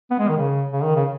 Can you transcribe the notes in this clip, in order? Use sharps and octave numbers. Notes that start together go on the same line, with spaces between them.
B3
G#3
D#3
C#3
C#3
D#3
C#3